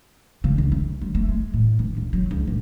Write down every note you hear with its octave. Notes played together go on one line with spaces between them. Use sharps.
C#3
C#2
D2
F#3
A3
G#3
A2
B2
C#2
F#3
C#2
A#2